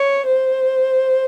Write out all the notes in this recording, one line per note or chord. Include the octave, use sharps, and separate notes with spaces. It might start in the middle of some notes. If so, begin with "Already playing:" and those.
Already playing: C#5
C5